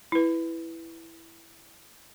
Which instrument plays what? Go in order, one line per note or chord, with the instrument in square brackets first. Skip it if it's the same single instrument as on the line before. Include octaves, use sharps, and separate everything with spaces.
[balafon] E4 B4